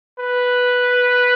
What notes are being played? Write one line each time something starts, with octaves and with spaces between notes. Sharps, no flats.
B4